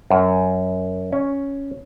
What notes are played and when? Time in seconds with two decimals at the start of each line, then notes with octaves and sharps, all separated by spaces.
0.10 F#2
1.13 C#4